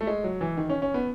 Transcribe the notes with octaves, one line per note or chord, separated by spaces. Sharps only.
A3
G#3
F#3
E3
D#3
C#4
C#4
B3